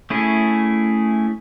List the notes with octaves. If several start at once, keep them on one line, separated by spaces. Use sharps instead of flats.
A3 C#4 E4 G#4